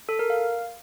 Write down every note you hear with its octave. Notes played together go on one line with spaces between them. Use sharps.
A4
A#4
F5